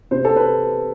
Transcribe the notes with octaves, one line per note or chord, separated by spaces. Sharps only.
C3 C5
A4
B4